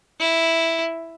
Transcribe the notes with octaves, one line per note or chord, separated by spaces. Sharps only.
E4